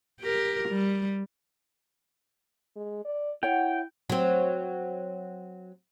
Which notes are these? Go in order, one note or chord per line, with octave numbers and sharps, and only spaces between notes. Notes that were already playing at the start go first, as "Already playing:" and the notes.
G4 A#4
G3
G#3
D5
E4 C#5 F#5 G5
F#3 C4